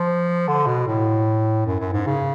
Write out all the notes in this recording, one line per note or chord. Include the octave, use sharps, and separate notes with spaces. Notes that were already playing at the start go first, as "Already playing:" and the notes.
Already playing: F3
D3
B2
A2
F#2
F#2
G#2
C#3